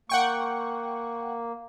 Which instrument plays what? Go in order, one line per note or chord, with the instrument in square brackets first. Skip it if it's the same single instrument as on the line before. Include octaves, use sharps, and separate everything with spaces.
[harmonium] A#3 [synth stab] F#5 G5 C#6